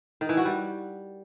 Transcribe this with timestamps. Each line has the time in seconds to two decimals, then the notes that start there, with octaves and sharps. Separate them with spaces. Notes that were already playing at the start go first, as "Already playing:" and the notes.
0.21 D#3
0.29 E3
0.37 F#4
0.45 G3